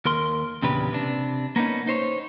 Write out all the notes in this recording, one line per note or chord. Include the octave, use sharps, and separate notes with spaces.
D#2 A#4 C6
E2 A#2 C#3 D4 G4 B4
C3 D4
A#3 B3 C#4 D#4
D#4 C5 C#5